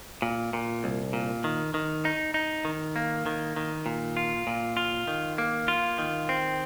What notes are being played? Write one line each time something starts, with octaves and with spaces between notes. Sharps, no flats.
A#2
A#2
C2
A#2
D#3
D#3
D#4
D#4
D#3
A#3
D#3
D#3
A#2
F4
A#2
F4
D#3
A#3
F4
D#3
C4